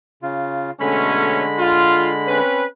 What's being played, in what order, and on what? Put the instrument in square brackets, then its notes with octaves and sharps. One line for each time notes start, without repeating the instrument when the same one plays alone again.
[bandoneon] C#3 F4
[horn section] B2 A3 C#4 [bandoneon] D3 G#3 B5
[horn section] F4
C4 C#4 B4